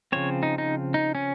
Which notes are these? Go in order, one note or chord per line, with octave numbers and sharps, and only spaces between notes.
C#3 F3 C4 C#5
D#4
D#4
D#4
C#4